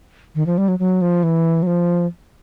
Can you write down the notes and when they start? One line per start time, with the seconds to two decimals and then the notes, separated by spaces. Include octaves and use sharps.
0.35 D#3
0.46 F3
0.58 G3
0.68 F#3
0.79 F#3
1.02 F3
1.23 E3
1.63 F#3
1.67 F3